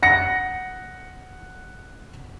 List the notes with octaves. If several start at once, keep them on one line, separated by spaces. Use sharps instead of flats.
F#5 A#6 C#7